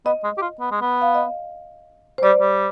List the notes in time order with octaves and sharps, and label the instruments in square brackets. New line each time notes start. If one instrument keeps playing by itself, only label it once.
[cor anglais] B3 [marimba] D#5
[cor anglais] G#3
G4
F4
B3
G#3
B3
[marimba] F5
D#5
C5
[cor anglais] G3 [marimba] D5
[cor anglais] G3